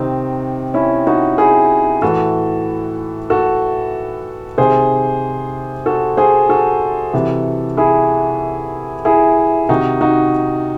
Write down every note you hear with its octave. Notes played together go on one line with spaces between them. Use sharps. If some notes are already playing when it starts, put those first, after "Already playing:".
Already playing: C3 D#3 C4 D#4
C#4 E4
D#4 F#4
E4 G#4
A2 E3 F#4 A4
F#4 A4
C3 D#3 G#4 C5
F#4 A4
G#4 C5
F#4 A4
C3 E3
E4 G#4
E4 G#4
C3 D#3 D#4 F#4
D#4 F#4